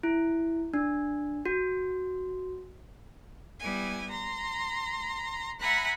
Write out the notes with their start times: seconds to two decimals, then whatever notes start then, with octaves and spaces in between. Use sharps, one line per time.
0.03 E4
0.74 D4
1.46 F#4
3.58 G3 B3 E4 G#5
4.10 A#5 C6
5.59 E5 F#5 G#5 A#5 B5 F#6